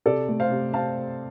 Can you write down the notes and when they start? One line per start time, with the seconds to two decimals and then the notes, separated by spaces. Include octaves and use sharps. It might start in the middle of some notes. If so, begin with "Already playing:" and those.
0.06 C3 A4 D5
0.29 A3
0.40 C5 F5
0.50 C3
0.73 C4 F5 A5